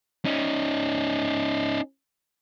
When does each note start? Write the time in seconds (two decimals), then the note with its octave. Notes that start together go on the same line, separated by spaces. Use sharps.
0.25 C#4 D#4